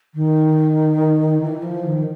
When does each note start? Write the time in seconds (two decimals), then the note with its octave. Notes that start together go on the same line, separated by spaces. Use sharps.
0.14 D#3
1.42 E3
1.62 F3
1.84 D#3